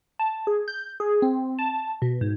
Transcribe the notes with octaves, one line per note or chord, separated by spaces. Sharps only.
A5
G#4
G6
G#4
C4
A5
B2
G#2